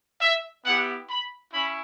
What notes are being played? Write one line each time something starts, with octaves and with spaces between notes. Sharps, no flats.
E5
B3 E4 G4 F#5
B5
C#4 E4 B5